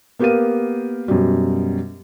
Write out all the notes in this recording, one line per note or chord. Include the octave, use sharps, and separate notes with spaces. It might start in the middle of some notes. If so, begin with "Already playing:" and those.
A#3 B3 G4 A#4 F5 D#7
F#2 B2 G3